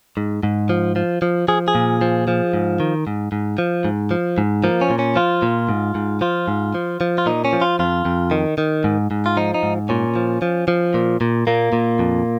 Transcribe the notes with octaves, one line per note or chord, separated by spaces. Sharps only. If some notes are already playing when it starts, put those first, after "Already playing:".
G#2
G#2
F3
F3
F3
F3 G#4
G#4
A#2
F3
F3
G#2
D#3
G#2
G#2
F3
G#2
F3
G#2
F3 A#3
C#4
A#2
C#4
F3 F4
A#2
G#2
G#2
F3 F4
G#2
F3
F3
F4
A#2 D#4
C#4
F3
F4
F2 F4
F2
D#3
D#3
G#2
G#2
F4
F3 D#4
D#4
G#2
A#2 C#4
F3
F3
F3
A#2
A#2
A#2 A#3
A#2
F2